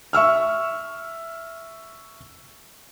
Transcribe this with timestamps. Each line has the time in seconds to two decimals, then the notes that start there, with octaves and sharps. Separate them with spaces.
0.13 E5 C#6 E6 F6